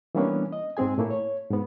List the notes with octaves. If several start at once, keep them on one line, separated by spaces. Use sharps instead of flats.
E3 G3 A#3 B3 C#4 D4
D#5
G#2 G#3 C4 G#4 G#5
A2 A3 A#3 E4
C#5
G#2 B3